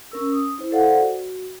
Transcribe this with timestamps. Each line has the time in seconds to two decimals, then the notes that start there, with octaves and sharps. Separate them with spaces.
0.12 C#4 A#4 E6
0.32 D#6
0.58 E4 C5
0.72 A4 C5 D5 F5 F#5
0.99 F#4